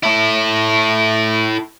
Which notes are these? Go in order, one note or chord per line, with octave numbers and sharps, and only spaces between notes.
E4 A4